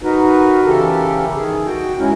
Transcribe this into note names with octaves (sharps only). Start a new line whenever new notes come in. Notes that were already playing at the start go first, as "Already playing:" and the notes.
D#4 F#4 A#4 B4
C#3 E3 G4 A4 A#4
D#3 G#4
F#4 G5
G#3 C#4 E4 A#4